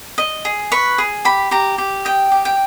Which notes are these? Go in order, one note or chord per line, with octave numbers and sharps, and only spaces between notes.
D#5
G#4
B4 C#6
G#4
G4 B5
G4 A#5
G4
D#5 G5
G4
G5